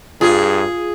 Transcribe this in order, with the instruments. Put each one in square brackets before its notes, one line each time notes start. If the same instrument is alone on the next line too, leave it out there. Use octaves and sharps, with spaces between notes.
[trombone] G2 [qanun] F4 [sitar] G#4